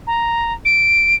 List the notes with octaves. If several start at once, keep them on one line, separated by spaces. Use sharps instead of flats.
A#5
D7